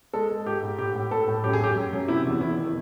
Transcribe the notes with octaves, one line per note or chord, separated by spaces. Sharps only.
G#3 A4
G#3
G#2 G4
G#2
A2 G4
A2
A2 A4
A2
F#2 G4
G#4
F#2 G4
F#2
F#2
C3 E4
E2
E2 E4
D#3